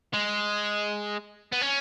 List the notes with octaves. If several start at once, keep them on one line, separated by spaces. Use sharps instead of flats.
G#3
B3
C#4